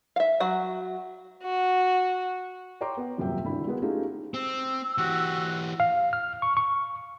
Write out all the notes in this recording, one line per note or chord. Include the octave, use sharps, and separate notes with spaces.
E5 F5
F#3 F#4 F#5
F#4
C#5 G5 A#5 C6 D6
B3
D#1 F#2 C3 E5 G5
G#1 D3 E4 B5
G#3 A#3 B3 F#4
A3 C#4 D#4 F4 G4 G#4
C4 E6
E3 F#4 G4
F5
F6
C#6
C#6